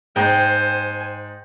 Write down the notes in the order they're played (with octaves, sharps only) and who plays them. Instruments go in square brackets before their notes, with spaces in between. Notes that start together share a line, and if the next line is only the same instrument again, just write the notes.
[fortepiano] G#2 [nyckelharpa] C5 G#5 [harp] G5